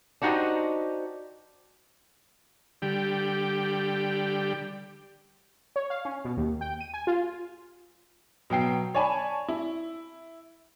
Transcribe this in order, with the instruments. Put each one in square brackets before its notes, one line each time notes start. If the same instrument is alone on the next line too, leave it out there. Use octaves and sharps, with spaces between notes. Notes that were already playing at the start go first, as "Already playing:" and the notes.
[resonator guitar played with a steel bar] D4 D#4 F#4 G4 C5 D#5
[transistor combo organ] D3 G3 G4
[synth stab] C#5
F5
C#4
B2
D#2
G5
D#7
G#5
F4
[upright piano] B2 F#3 G5 C7
C#5 D5 G#5 A5 B5
E4